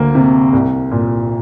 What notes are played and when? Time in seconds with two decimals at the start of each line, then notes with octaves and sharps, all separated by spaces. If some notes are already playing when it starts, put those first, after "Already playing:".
Already playing: D2 A#3
0.15 C3
0.53 C2
0.91 A#2